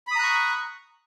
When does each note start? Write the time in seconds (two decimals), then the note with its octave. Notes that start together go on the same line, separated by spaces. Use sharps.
0.07 B5
0.11 D#6
0.15 A#5
0.19 F#6
0.23 C#6